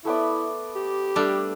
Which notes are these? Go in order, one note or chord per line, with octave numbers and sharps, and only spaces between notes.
A3 B3 E4 D5
G4
G3 A3 D4